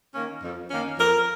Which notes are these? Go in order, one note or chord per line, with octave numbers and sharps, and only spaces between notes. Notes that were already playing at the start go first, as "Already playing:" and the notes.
D#3 A#3 C#4
F2
D#3 A#3 C#4
F2 A#4